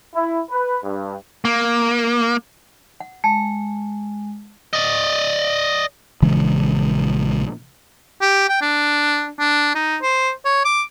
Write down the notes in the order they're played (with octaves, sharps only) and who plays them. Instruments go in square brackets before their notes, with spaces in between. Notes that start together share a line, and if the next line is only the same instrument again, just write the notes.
[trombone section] E4
B4
G2
[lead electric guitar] A#3
[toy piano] F#5
[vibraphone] G#3 [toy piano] A5
[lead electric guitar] D5 D#5
[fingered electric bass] A#1 C#3 E3 G#3
[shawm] G4
G5
D4
D4
D#4
C5
C#5
D6